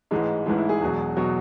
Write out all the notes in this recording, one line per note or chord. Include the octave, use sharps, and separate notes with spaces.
A1 G#2 E3 G#3 D#4
A1 G#2 E3 G#3
E4
G#4
E1 E2 B2 F#3
B2 F#3